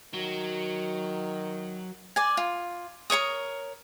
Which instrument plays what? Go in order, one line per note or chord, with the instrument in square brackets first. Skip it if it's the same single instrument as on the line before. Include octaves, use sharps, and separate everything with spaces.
[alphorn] D#3 [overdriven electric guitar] F#3
[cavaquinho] D5 G#5
F4
A#4 C#5 C#6 D#6